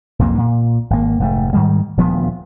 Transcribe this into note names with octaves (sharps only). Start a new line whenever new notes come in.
B1 F2 G#2 A#3
A#2
G#1 A#3
F1 G#2 A3
G#2 D#3 G3 G#3
D#1 D2 F3 B3